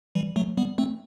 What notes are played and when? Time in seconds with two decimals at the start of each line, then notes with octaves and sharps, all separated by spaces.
0.15 E3 G3
0.36 F#3 A3
0.57 G3 B3
0.78 A3 C4